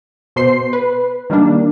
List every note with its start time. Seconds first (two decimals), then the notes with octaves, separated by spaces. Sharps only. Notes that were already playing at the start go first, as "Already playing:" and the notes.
0.36 B2 C5 C6 C7
0.73 B4
1.30 D#3 G3 A#3 D4